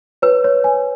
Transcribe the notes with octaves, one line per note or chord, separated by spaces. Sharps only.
B4 C#5
C#5
G#5